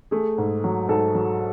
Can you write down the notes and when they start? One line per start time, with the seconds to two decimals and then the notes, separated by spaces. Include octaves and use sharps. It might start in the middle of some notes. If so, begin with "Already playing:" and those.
0.11 A3 G#4
0.38 G#2
0.64 F#3
0.89 G#2 A4
1.14 F#3